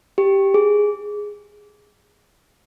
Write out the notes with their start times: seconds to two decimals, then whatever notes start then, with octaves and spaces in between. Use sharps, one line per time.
0.18 G4
0.54 G#4